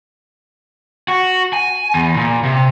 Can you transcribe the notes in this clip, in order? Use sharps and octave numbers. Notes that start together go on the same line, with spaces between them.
F#4
G#5
E2
A#2
C3